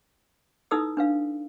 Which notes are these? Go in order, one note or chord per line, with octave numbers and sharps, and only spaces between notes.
D#4 E4 A4 B4 D#6 E6
D4 B4 F5